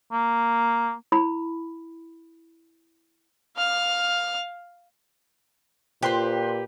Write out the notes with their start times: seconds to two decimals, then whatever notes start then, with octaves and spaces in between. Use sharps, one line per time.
0.12 A#3
1.12 E4 B5
3.56 F5 F6
6.03 A#2 F4 G4 B4 C5 G5 C6 F#6